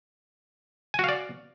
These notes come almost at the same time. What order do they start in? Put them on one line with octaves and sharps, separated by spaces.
G#5 F#4 F5 D5